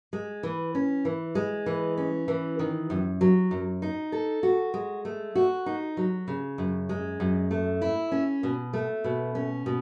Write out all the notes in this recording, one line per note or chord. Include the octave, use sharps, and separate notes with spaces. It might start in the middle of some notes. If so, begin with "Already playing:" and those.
G#3
E3
C#4
E3
G#3
E3
C#4
E3
D#3
F#2
F#3
F#2
D#4
A4
F#4
G#3
A3
F#4
D#4
F#3
C#3
F#2
G#3
F#2
A3
E4
C#4
B2
A3
B2
C#4
B2